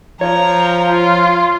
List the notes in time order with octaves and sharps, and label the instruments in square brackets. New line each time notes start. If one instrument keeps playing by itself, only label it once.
[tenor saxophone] F3 [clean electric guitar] C#5 [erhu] A#5
[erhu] F4